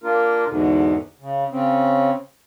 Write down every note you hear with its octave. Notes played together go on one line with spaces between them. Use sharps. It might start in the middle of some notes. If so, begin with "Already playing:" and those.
A#3 D4 F4 A#4
E2 G#2 B2 D3
C#3
C#3 C4 C#4